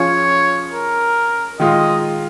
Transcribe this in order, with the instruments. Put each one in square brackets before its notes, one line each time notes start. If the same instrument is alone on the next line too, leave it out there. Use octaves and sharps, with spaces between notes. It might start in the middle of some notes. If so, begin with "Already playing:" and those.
Already playing: [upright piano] F3 C#4 F4 G#4 [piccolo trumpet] C#5
[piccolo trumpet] A#4
[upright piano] D#3 G#3 F4 [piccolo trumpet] D#5